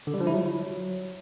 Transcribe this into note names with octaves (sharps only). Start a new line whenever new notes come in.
D3
G3
F3
E4
F#3